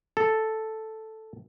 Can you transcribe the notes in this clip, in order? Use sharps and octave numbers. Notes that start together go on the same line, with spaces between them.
A4